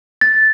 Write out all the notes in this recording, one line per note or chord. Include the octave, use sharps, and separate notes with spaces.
A6